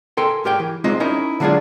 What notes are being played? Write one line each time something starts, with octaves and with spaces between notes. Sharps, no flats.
A4 A#4 G5 G#5 C6
G#2 G4 A#4 C#5 G5
E3
G#3 C4 D#4 F4 D#5
C#4 D#4 E4 A#4 C#5 D#5
D3 F#3 G#3 D4 F4 G#4